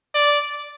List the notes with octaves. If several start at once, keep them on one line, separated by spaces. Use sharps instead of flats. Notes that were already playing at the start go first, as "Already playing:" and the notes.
D5